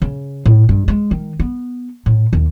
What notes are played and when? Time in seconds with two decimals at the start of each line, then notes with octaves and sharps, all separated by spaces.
0.02 C#3
0.46 A2
0.69 G2
0.88 G#3
1.11 D#3
1.39 B3
2.06 A2
2.33 D#2